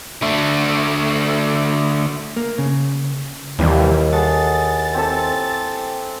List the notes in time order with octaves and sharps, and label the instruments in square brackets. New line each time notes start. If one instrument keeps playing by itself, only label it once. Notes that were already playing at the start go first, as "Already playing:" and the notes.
[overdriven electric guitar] D3 A3
[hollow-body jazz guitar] A#3
C#3
[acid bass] D#2 [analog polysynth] C3 E3 G3 [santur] E4
[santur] G#4 A4 F#5 [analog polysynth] A6
[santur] C4 G4 A4